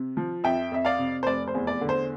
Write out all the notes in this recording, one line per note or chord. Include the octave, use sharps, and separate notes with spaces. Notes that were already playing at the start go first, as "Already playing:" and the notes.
Already playing: C3
F3
F2 E5 G5
F2 E5
D5 F5
C3
C5
F1 D5
C5
E2
D5
D3
C5